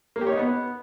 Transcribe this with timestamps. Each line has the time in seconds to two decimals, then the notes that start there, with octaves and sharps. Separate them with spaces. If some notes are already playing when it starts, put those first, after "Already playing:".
0.16 A#3
0.21 G4
0.27 C#5
0.32 D#4
0.37 B3